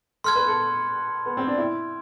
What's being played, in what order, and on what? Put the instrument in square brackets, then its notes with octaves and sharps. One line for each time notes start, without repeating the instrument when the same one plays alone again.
[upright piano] A4 [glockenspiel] C6 F6 G#6
[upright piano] B4
A4
B3
C4
D4
E4